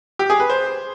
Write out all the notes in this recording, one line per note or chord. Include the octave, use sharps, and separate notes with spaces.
G4
G#4
B4
C5